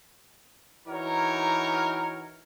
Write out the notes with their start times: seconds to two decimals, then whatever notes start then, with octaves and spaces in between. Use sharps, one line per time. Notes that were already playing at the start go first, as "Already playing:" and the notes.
0.86 E3 D#4 F#4 A#4 C#5